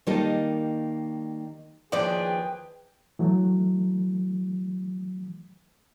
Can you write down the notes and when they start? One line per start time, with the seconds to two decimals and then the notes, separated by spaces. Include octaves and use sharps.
0.07 D#3 G3 A#3 D#4 A4 D#5
1.92 D#2 B2 E3 F3 G#4 B4 D5 G5
3.19 E3 F#3 A3